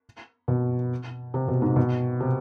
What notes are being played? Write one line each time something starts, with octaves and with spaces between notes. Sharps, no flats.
B2
C3
B2
G#2
B2
C3